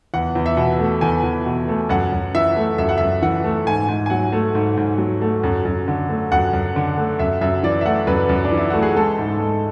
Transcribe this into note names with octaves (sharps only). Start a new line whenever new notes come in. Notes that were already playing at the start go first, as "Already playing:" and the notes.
E2 F#5
E2
E5
B2 F#5
A3
E2 G#5
E2
B2
A3
F#2 F#5
F#2
E3 E5
A3
F#2 E5
F#5
F#2 E5
E3 F#5
A3
G#2 G#5
G#2
G#5
F#3 F#5
A3
G#2
G#2
F#3
A3
F#2
F#2
D3
A3
F#2 F#5
F#2
D3
A3
F#2 E5
F#2 E5
E3 D5
E5
A3 F#5
F#2 B4
F#2
D4
E3
E4
A3 F#4
G#4
G#3 A4
G#2
G#3